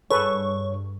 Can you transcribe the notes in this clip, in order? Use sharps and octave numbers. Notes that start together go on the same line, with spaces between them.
G2 G#4 A4 B4 C#5 C#6